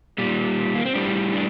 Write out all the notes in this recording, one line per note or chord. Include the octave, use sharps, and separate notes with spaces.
A#2 G3
A#3
C4
A2 G3 D4
D4